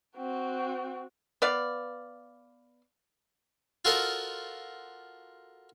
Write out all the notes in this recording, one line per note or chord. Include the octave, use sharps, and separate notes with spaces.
C4 F#4
B3 D5 F5
F4 F#4 A4 A#4 C5 D#5